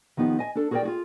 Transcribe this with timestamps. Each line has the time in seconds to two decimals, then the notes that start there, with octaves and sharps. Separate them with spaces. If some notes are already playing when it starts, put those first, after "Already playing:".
0.17 D#3 F3 B3 D#4 G4
0.39 D#5 G#5
0.55 D4 A4
0.71 F#4 G#4 A#4 C5 D5 G5
0.83 F4 F#4 G#4